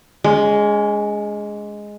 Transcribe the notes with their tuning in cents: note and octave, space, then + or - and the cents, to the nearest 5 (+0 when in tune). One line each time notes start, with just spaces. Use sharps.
G#3 +0 C#4 +40